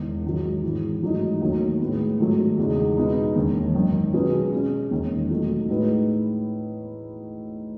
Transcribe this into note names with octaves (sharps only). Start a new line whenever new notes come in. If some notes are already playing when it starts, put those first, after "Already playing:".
Already playing: E1 E2 D#3
G#2 D#3 F#3
G#1 G#2 E3
A1 G#2 F#3 A3 D#4
D#2 D#3 F#3 A3
A2 G#3 B3
G#2 D#3 F#3 A3
E2 C#3 G#3 D#4
B2 G#3 B3 D#4
E1 D#2 D#3
G#1 F#2 D#3
B2 F#3 C#4 G#4 B4
B2 G#3 C#4
E1 D#2 D#3
B2 F#3 A3 D#4 A4
A2 G#3 D#4 F#4 B4